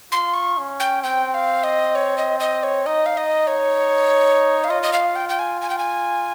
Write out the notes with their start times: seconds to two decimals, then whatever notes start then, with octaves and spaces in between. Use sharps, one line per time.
0.12 F4 C6
0.34 C#6
0.58 C#4
0.80 G5
1.03 C4 G5
1.34 F5
1.64 D#5
1.95 C#5
2.18 D#5
2.40 D#5
2.63 C#5
2.86 D#4 D#5
3.06 F5
3.17 D#5
3.47 C#5
4.64 F5
4.69 F4 D#5
4.83 D#5
4.93 F5
5.16 G5
5.29 G5
5.39 G#5
5.61 G#5
5.70 G5
5.79 G#5